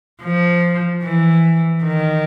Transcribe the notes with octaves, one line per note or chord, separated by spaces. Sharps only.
F3
E3
D#3